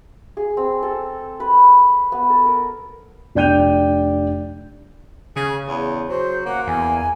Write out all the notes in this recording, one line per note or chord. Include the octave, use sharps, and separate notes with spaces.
G#4
C4
A4
B4
B3
A4
A#4
F1 D4 G5 G6 D#7 F7
C#3 G#4
E2
F#3 C5
A#3 F#5
E2 G#5